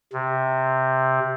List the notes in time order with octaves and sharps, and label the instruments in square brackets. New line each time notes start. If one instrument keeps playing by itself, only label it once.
[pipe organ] C3